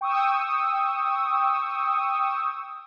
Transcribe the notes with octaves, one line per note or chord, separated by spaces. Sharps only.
G5 C#6 D#6 E6